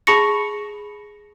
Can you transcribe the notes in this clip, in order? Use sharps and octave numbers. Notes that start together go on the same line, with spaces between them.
G#4 A5 B5 C#6 A#6 C#7